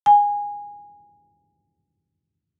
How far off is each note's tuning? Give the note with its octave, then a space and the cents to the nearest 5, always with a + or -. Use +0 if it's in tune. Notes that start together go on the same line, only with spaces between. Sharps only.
G#5 -15